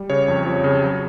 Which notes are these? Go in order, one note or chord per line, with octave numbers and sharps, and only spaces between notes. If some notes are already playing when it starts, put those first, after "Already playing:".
Already playing: G3
C#3 C#5
F2
F3
C#3
F#3